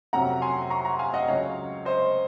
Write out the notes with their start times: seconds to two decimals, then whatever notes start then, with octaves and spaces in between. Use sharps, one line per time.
0.13 F2 C3 F#3 C#4 F#5 A#5
0.42 G#5 C6
0.70 A#5 C#6
0.85 F#5 A#5
0.99 F5 G#5
1.14 D#5 F#5
1.28 C#2 C#3 F#3 C#5 F5
1.85 C5 D#5